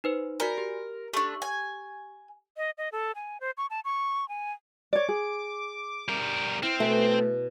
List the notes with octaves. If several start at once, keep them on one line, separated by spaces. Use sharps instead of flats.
D#4 B4 C5
F#4 A#4 D5 G#5
G4
A3 D4 G4 C#6
G#5
D#5
D#5
A4
G#5
C5
C#6
A5
C#6
G#5
C#5 D5 D6
G#4
G3 A#4
C4 E4 F6
B2 A3 B4 G#5